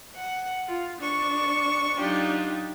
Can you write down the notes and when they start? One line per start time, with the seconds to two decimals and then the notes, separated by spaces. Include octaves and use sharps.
0.14 F#5
0.67 F4
1.00 D4 C#6
1.97 F#3 D4 D#4 F4 G4